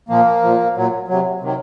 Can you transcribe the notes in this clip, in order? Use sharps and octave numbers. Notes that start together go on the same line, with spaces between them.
A#2 F3 A#3
A#2 F3
A#2 F#3
C3 F#3
C3 D#3 F#3